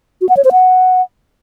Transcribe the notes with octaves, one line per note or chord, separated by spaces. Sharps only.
F#4
F#5
C#5
C5
F#5